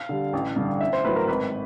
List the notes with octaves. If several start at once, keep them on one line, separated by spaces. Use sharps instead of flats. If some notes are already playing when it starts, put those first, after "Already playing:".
Already playing: F5
D3 G3
A1
G2 D3
A1 E5
C5
A2 F#3 B4
A#4
G#1 B4